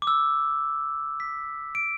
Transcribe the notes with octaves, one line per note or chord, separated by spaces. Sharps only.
D6
E6
B6
D7